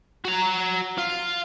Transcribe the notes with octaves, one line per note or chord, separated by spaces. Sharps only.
F#4 A#5
F4